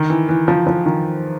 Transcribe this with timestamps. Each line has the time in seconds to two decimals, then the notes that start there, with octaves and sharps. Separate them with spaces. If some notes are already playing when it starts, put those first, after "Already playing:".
Already playing: D#3
0.10 E3
0.29 E3
0.48 F3
0.67 F3
0.86 D#3